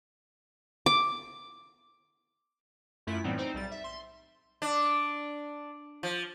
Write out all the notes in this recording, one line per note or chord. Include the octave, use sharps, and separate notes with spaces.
D6
F#2 A3 E4 F4 B6
A2 E3 G3 B3 C4 D#4
C4 D#4 C5
B1 G3 A6
E5
C6
D4
F3